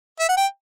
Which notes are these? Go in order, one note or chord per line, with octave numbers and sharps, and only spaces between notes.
E5
F#5
G5